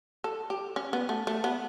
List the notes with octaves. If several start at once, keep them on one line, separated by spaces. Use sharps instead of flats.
A4
G4
C#4
B3
A3
A3
B3